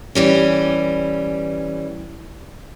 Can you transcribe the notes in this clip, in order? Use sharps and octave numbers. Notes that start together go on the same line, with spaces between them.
E3 G3 C#4